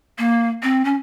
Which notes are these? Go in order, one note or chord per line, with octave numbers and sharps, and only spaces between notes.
A#3
C4
C#4